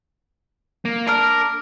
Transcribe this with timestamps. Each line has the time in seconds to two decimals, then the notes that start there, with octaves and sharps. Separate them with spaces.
0.85 A#3
1.07 D4 A#4 F6